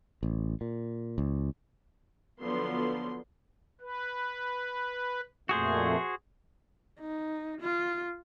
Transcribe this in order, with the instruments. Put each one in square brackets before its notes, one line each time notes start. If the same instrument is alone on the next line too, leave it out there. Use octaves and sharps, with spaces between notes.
[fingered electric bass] A1
A#2
C#2
[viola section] D3 F3 F#3 B3 C6
[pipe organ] B4
[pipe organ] F2 A#2 A3 [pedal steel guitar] F#4 G#4 C5
[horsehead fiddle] D#4
F4